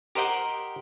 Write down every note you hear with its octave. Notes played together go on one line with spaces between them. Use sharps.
G4 A#4 C5 D#5 F#5 G5